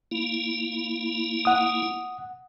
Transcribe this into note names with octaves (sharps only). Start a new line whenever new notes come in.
A#3 E4
F#5 D#6